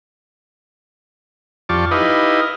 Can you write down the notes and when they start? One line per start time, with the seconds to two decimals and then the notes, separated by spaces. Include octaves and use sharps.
1.69 F2 F4 G4 D5 A5 C#6
1.91 D#4 E4 G4 B4 D#5 F5